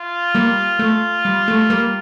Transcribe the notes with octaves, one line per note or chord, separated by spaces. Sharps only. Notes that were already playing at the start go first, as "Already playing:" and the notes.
Already playing: F4
G3 A#3
A3
G3
A3
G3 A#3